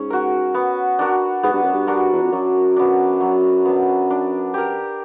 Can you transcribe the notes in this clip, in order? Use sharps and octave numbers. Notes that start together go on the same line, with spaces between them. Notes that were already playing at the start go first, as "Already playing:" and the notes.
Already playing: G#2 C#4
F#4 A#4
B3
D4 F#4 A#4
G#2 B3
G2
F#2
G2
D4 F#4 A#4
E2
F2
F#2 F#3
B3 D4
F#3
B3 D4
D4
G4 A#4